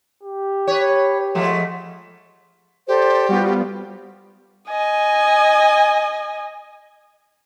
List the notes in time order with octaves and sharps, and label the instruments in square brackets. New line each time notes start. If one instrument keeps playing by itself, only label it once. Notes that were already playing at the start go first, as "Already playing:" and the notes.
[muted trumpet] G4
[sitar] B4 C#5
F3 G#3 A3
[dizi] G4 [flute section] A4 C5 D5
[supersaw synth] G3 B3 F4 [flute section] F#4
[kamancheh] D#5 G#5